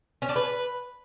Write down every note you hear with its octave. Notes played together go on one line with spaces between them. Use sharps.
C#4
D4
B4